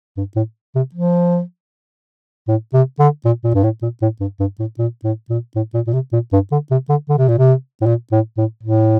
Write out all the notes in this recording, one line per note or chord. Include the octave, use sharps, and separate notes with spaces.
G2
A2
C3
F3
A2
C3
D3
A#2
A#2
G2
A2
A#2
A2
G2
G2
A2
A#2
A2
A#2
A2
A#2
A#2
C3
A#2
G2
D3
C3
D3
D3
C3
A#2
C3
A2
A#2
A2
A2
A2